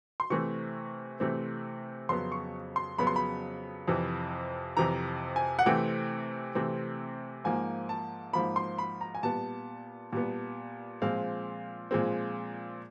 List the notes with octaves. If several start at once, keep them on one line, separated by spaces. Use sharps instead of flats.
C6
C3 E3 A3 C4 C#6
C3 E3 A3 C4
F2 C#3 F#3 B3 C6
C#6
C6
F2 C#3 F#3 B3 B5
C6
B5
F2 C3 E3
F2 C3 E3 A#5
G#5
F#5
C3 E3 A3 C4 G5
C3 E3 A3 C4
G#2 F3 A#3 G#5
A5
G#2 F3 A#3 B5
C6
B5
A#5
G#5
A#2 G3 B3 A5
A#2 G3 B3
A#2 F3 G#3 C4 F5
A#2 F3 G#3 C4